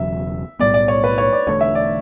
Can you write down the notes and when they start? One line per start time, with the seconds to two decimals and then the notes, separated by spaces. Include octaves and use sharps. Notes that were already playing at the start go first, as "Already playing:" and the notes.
Already playing: E1 E2 C#3 F#3 E5
0.59 B1 A2 G3 B3 D5
0.74 D5
0.88 C#5
1.04 B4
1.18 C#5
1.33 D5
1.47 E1 E2 D3 A3 C#5
1.61 E5
1.75 D5